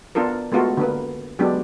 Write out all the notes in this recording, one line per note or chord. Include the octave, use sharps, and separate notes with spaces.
B3 D4 F4 A4 A#4
G#3 A3 B3 F4 F#4 A4
D3 A#3 B4
F#3 G#3 B3 D4 G4